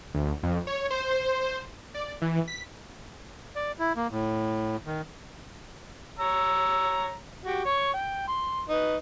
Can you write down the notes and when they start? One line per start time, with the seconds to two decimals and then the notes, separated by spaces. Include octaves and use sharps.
0.15 D2
0.43 F2
0.67 C#5
0.90 C5
1.94 D5
2.22 E3
2.48 B6
3.56 D5
3.79 E4
3.96 A#3
4.11 A2
4.86 D#3
6.19 C#5 A#5 E6
7.45 F#4 G4
7.66 C#5 C#6
7.94 G5
8.28 C6
8.69 D#4 B4